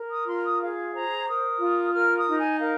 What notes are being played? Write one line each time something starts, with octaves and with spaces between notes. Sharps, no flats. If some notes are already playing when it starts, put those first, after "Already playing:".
Already playing: A#4
D#6
F4 C6
D#6
G#4 F5
C5 A#5
A#4 D#6
F4
A#4 F6
D#6
D#4
G#5
A#4 F5